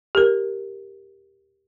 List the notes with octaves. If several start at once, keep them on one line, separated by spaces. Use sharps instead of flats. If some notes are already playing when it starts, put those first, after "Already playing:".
G4 A#4